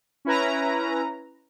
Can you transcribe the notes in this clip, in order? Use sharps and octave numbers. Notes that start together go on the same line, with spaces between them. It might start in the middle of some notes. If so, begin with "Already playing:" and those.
C#4 E4 B4 A#5